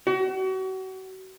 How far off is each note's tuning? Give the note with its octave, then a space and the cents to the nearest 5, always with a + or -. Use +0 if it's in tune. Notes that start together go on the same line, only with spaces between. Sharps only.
F#4 +35